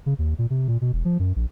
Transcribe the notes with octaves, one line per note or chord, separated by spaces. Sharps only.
C#3
D#2
A#2
C3
A#2
B2
E1
F3
F#2
A#1